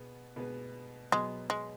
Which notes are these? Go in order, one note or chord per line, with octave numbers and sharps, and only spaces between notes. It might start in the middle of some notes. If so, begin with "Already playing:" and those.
Already playing: B2 B3 G#4
B2 B3 G#4 B4
B2 F#3 G#3 B3
G#3